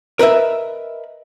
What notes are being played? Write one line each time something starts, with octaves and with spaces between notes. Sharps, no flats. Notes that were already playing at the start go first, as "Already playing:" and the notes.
A#4 B4 D#5 E5